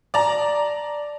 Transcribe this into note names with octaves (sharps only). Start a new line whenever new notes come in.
D5 A5 A#5